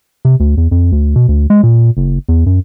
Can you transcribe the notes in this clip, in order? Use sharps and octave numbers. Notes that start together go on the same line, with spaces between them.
C3
D2
E2
F2
D2
B2
D2
G#3
A#2
F#1
E2
F#2